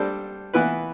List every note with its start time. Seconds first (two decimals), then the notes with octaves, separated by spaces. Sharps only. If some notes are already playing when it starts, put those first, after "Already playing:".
Already playing: G3 D4 A4 C5
0.53 E3 B3 E4 B4